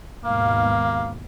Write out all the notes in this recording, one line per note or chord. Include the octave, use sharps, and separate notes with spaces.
D#2 G#2 B2 A#3 F5